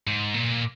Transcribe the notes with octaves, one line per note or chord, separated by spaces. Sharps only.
G#2
A#2